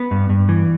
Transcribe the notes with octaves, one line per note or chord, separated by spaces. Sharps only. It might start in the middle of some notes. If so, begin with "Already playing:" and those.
Already playing: B3
G2
G2
E3